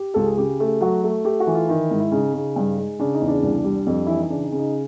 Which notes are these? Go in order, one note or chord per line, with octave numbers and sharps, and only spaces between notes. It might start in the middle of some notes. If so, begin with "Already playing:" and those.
Already playing: G4
C#2 A4
G#4
C#3 G4
A3
F#3 F#4
A3
A3 G4
F#4
E3
F4
D#3 E4
G#2
E4
C#3 D#4
C#3
G2
G#3
C#3 D4
D#4
E2
D4
C2
G3
F2
E3 E4
D#4
C#3 D4
D#4
C#3
D#4